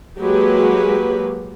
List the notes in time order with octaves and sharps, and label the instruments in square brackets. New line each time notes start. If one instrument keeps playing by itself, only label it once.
[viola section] F#3 G#3 A#3 F#4 G4 B4